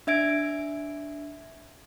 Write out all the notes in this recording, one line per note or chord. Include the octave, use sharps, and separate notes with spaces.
D4 E5 G#6 D7